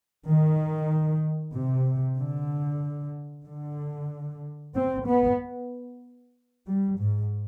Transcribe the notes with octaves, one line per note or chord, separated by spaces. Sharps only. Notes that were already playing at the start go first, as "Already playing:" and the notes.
D#3
C3
D3
D3
C4
B3
G3
G#2